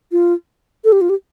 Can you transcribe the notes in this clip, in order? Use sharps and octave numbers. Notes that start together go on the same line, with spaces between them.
F4
A4
G4
F4
G4